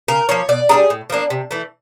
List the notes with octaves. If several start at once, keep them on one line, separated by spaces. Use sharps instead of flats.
C#3 A#4
F3 A#3 C#5
B2 D5
G3 A#3 D4 G#4
A2
F3 A#3 D4
C3
E3 A3